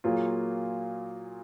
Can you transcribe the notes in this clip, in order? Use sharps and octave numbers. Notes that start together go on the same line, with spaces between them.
A#2 F#3 A#3 F4 G#4